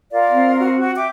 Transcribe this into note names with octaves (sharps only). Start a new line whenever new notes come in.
F4 A#4 D5 F5
C4
F#4
F#4
E5 G5 D6